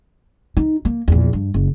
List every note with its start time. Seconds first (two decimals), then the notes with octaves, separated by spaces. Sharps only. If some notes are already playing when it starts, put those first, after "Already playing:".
0.57 D#4
0.85 A#3
1.08 A#1 E2
1.33 G2
1.54 F#1